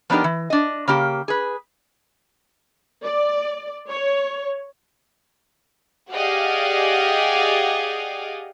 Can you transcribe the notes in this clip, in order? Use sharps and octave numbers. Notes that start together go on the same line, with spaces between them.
F3 B3 D4 D#4 G4 A#4
E3
D4 D#5
C#3 A#3 G4
G#4 B4
D5
C#5
G4 G#4 D5 D#5 F5 F#5